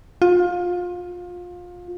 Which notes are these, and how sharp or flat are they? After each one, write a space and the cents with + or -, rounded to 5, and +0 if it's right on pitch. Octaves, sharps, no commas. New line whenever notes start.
F4 +25